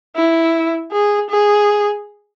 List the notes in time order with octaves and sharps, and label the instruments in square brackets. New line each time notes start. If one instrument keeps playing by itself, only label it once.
[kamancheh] E4
G#4
G#4